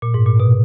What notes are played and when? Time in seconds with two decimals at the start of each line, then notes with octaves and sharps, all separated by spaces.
0.02 A#2
0.14 G#2
0.26 A#2
0.40 B2